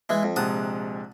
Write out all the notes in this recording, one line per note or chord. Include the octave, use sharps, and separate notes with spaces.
E3 G#3
F2
A#1 C3 G#3 F#5 A5 D#6